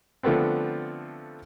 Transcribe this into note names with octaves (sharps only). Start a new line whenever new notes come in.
D3 F3 A3 B3 C4